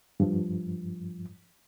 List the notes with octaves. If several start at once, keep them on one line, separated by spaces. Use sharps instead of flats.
G2 F3